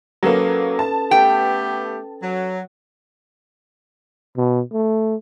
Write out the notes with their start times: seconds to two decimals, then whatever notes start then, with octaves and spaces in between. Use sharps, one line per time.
0.23 F#3 A#3 C#4 A4 B4
0.79 A5
1.11 A3 B3 G4 G5
2.23 F#3
4.37 B2
4.73 A3